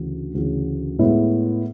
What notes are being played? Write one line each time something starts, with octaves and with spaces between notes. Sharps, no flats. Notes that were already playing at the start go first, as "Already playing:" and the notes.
Already playing: D2 C#3 E3
D2 C#3 E3
A2 G#3 B3 E4